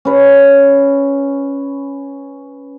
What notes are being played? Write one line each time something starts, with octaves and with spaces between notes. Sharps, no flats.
C#4 B4